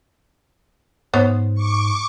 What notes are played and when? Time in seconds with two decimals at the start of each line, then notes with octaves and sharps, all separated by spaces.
1.14 G#2 B3 C5 C#5
1.55 C#6 D6